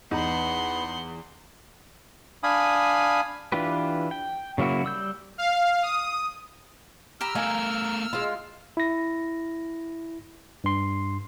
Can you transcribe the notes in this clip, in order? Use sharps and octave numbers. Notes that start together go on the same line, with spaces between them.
E2 B3 D#4 F#5 C6
D4 F5 G#5 B5 D#6
E3 D4 F4 G4 B4
G5
C#3 F#3 A#3 E4 F#4
G3 E6 G6
F5
D#6
G4 A#5 B5 E6 F6
A3 A#4 F5 G#5 A#5
G#3 F4
E4 A#6
G2 C6